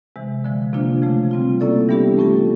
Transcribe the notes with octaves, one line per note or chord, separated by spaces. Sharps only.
C3 E3 G#3
D3 F3 G#3
C3 F3 A#3 D4 F4
C#3 F3 A3
G3 C4 F4
A#3 C#4 E4 A4 D5
E3 G3 B3 D4 G4
A3 C#4 F4 A4